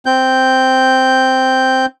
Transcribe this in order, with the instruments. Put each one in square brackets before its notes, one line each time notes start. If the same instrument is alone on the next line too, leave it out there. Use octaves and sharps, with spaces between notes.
[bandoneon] C4 G6